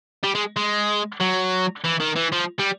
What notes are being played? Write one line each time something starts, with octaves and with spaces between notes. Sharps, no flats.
G3
G#3
G#3
F#3
E3
D#3
E3
F3
G3